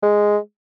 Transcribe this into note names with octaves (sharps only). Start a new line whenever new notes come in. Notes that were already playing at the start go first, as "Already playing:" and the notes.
G#3